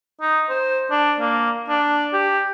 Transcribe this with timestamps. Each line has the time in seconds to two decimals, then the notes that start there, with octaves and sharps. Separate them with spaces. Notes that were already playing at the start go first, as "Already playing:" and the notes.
0.21 D#4
0.50 C5
0.91 D4
1.20 A#3
1.69 D4
2.13 G4